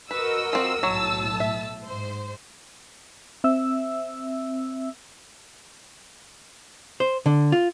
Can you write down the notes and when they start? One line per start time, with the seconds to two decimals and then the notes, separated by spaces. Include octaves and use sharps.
0.11 F#4 A#4 B4 D#5 E6
0.53 F3 C4
0.83 B1 A2 F#3 A5
1.40 E5
1.84 G#2 C5
3.44 C4 E5 E6
7.00 C5
7.26 D3
7.52 F4